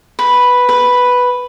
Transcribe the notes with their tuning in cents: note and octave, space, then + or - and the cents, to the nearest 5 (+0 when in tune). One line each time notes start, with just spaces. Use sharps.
B4 +0
B4 +0